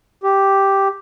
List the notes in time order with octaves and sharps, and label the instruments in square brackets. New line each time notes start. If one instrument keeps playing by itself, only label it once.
[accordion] G4